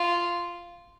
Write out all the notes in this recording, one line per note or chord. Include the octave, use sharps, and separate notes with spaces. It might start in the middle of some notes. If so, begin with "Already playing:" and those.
Already playing: F4